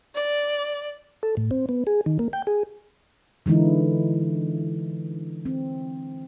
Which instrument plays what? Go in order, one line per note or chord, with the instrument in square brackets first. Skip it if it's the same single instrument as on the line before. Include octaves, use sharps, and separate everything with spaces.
[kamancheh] D5
[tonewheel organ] A4
A2
C4
B3
G#4
D#3
A#3
G5
G#4
[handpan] D3 E3 G#3 D#4 E4
C4